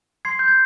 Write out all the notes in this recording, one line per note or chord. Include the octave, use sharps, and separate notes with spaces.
C6 G#6 C7
G6
G#6